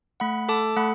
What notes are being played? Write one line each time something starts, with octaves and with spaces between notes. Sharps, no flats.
A3 F#5 B5
A4 A5 D6
A3 F#5 B5